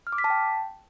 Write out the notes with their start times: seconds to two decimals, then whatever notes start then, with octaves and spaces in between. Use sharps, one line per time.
0.07 F6
0.13 D6
0.18 B6
0.24 A5
0.30 G5